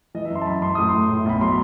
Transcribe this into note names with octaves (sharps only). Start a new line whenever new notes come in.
E3 D#5
E5
F#2 C6
A5
F#2 B5
F#2 C6
A2 D#6
A3 C6
A2
B1 B5
F#3 C6